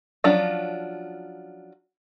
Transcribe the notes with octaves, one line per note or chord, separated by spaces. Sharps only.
F3 F#3 C#4 D4 F4